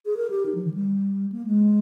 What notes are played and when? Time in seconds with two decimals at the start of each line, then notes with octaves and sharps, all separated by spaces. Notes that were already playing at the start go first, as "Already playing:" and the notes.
0.06 G#4
0.17 A#4
0.30 G4
0.46 D#4
0.55 F3
0.65 D#3
0.74 G3
1.32 A#3
1.47 G#3